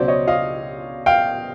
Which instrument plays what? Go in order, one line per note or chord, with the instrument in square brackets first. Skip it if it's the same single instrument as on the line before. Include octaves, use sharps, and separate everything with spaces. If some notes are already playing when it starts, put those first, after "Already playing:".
Already playing: [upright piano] C#2 B2 F#3 C5 D5
C#5 D#5
D#5 F5
F5 G5